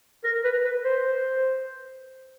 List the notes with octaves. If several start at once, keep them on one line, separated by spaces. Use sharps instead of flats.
A#4
B4
B4
C5